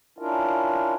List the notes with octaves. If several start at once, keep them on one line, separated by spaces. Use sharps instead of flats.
C#4 D4 E4 F4 A#4